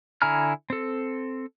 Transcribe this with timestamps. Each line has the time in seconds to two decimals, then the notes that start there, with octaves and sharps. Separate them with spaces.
0.22 D3 E4 G#5 A#5 F6
0.70 C4 A4